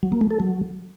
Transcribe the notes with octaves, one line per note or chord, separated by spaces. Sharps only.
F#3
A#3
A3
A4
F#3